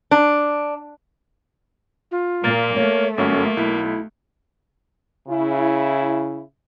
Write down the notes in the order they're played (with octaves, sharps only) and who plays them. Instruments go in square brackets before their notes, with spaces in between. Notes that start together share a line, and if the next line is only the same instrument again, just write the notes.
[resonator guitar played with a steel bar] D4
[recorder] F4
[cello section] A#2 [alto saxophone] A#3 [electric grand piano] A#4 A6
[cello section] A3 [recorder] C#5
[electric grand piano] G1 F#2 F#4 [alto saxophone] A#3 [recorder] C#4
[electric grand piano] B1 [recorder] E4
[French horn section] C#3 E4